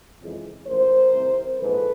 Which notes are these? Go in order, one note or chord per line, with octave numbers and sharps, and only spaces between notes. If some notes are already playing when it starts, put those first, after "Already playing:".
F2 C#3 E3 G#3
A1 A2 F3 A3 A#4 C5
C2 C3 D#3
A#1 G#2 E3 A4 B4